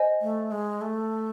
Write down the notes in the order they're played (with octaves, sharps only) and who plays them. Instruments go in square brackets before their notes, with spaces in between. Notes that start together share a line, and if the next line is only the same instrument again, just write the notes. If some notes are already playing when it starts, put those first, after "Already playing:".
Already playing: [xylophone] C5 D#5 G#5
[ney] A3
G#3
A3